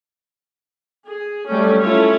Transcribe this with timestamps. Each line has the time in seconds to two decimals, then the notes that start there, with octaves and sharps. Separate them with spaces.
1.08 G#4
1.47 F#3 G3 A3 C#4
1.81 A3 C#4 E4 F4 A4 C#5